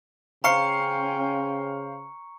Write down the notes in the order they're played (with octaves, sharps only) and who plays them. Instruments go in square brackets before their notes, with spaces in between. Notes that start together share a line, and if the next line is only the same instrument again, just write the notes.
[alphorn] C#3 [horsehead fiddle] C#4 G5 [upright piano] C5 F5 [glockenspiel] A#5 C#6 C#7